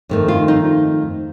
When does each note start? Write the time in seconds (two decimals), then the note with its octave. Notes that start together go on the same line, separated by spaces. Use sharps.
0.09 F2 D#3 A3
0.28 F4
0.48 D#4